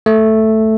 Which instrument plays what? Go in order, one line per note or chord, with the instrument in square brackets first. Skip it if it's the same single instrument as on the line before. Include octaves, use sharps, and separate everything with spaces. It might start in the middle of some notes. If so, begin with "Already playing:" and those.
[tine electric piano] A3